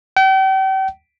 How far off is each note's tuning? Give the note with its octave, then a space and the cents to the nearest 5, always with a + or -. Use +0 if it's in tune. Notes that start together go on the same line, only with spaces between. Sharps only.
G5 -40